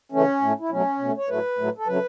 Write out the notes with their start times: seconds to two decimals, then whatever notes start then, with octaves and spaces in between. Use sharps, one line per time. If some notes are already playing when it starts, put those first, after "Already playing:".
0.12 C#3 E3 A3 C#4
0.41 A2 A3
0.60 E4
0.70 B2 F#3 A3 C#4
0.99 B2 A3
1.17 C#5
1.29 A2 F#3 A3 B4
1.58 A2 F#3 A3
1.78 A4
1.87 C#3 F#3 A3 B4